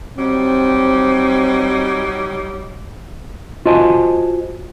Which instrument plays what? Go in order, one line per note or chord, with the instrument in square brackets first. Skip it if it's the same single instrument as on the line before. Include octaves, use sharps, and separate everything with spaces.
[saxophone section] F#3 G3 D#4 [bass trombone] C4
[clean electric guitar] F4 F#4 C5 D#5 G#5 A5